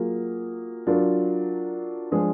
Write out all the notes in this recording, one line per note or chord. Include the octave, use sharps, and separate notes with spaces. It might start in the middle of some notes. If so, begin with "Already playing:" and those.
Already playing: F#3 A#3 F4 G#4
F#3 D4 F4 A#4
F3 G#3 D4 G#4